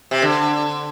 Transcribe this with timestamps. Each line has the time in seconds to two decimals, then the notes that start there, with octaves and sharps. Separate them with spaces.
0.11 C3
0.22 D3